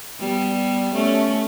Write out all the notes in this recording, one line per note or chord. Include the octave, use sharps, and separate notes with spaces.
G3 B3
A3 C#4